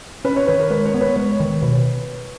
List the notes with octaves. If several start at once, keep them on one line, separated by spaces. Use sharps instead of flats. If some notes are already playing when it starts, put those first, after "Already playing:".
C#4 B4
C#5
D#3 B4
A#4
G#3 B4
C#5
B3
B4
G#3 C#5
D#3
B2 B4